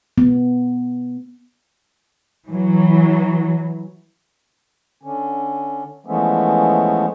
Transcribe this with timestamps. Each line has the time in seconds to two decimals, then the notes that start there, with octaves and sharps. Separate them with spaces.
0.18 B3
2.50 E3 F#3
5.03 D3 C#4
6.06 E3 F3 G#3 A3 B3 C#4